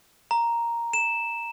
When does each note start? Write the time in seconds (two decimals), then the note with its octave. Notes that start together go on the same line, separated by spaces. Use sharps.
0.31 A#5
0.93 E7